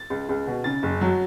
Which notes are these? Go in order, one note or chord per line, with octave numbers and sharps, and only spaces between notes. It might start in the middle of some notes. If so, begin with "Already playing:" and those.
Already playing: A6
C#2
C#2
B2
C#3 A6
F#1
F#3